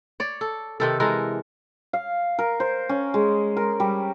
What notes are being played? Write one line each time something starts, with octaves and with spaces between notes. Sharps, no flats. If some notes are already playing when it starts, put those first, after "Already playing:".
C#5 D5
A4
C3 D#3 A4
E3 G#3 A4 A#4
F5
A#4
C5
C#4
G#3
A#4
G3